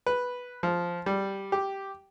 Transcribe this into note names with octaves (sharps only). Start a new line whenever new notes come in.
B4
F3
G3
G4